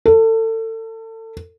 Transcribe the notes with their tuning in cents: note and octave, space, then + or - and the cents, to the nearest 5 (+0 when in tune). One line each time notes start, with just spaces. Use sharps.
A4 +30